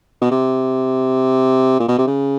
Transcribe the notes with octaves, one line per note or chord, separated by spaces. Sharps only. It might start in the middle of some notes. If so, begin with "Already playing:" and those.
B2
C3
A#2
B2
C3
C#3